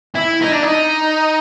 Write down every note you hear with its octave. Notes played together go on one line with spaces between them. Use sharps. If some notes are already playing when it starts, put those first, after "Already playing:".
E4
D#4
D4
D#4